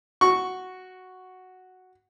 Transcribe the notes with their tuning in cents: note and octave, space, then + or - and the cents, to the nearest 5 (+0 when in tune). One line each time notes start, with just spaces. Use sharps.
F#4 +0 C#6 +0